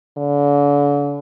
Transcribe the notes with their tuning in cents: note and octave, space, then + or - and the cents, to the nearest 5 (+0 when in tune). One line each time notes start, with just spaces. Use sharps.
D3 -40